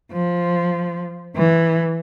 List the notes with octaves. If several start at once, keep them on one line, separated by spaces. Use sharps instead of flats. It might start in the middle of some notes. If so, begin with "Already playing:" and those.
F3
E3